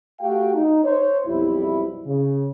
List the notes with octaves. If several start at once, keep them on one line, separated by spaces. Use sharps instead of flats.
A3 F#4 G4 F5 G5
D#4
C5 C#5
B1 F2 G3 E4
C#3